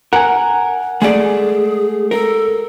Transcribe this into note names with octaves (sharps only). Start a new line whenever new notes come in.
A#4 F#5 G#5
G#3 A3 G#4 D5
A4 A#4